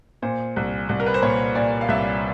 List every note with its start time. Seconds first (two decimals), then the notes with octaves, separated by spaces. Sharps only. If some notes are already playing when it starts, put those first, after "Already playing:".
0.22 A#2 C5
0.56 C2
0.89 C2
1.00 A#4
1.06 B4
1.14 C5
1.22 A#2 C#5
1.55 A#2 D5
1.81 F5
1.88 C2 E5